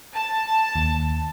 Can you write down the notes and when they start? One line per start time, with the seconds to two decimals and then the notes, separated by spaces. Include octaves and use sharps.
0.14 A5
0.75 D#2